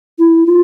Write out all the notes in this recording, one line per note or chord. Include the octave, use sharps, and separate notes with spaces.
E4
F4